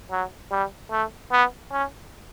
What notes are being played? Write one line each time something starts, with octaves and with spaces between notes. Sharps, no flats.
F#3
G3
A3
B3
C#4